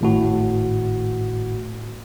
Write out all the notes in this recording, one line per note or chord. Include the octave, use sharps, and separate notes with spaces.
G#1 A2 F#4